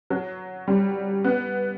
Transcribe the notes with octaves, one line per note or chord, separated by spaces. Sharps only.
F#3
G3
B3